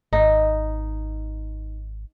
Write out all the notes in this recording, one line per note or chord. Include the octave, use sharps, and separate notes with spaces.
G#1 D#4